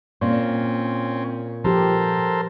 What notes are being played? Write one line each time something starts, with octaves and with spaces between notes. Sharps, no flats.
A#2 C4 C#4
F3 G4 A4 A#4 C5